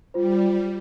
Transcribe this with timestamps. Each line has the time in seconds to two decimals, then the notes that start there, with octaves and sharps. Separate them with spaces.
0.14 G3 F4 C5